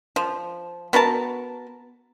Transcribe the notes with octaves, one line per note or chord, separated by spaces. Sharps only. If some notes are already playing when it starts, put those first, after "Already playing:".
F3
B3 F#4 A#4 A5